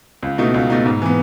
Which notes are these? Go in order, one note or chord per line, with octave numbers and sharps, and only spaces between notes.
C#2
B2 A3 D#4
C#2
B2 A3 D#4
G#2
E3 B3